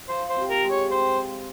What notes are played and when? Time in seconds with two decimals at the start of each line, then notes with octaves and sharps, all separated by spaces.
0.09 F3 C5
0.29 C5
0.36 C3
0.50 A#4
0.63 G#3
0.70 C#5
0.91 C4 C5